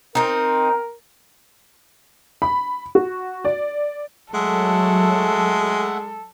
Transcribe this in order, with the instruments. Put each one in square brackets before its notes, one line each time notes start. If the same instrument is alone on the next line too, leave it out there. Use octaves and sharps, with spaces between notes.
[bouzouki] C4 D#4 [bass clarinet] A#4
[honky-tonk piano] B5
F#4
D5
[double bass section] F#3 [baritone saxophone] G#3 [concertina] A3 E5 F#5 [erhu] A4